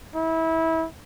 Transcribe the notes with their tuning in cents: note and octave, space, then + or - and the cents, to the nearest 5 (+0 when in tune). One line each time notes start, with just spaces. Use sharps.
E4 -25